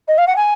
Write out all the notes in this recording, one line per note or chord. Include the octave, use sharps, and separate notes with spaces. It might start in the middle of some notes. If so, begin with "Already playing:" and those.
D#5
F5
F#5
G#5